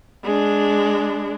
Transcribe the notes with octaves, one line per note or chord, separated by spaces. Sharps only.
G#3 D4